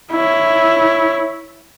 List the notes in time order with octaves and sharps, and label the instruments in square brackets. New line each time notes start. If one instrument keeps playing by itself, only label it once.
[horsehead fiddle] E4 C#5